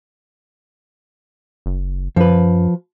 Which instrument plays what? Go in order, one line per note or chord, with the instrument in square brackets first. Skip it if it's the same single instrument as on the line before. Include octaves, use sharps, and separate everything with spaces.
[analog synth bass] F#1
[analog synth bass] F#2 [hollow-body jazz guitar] F3 B4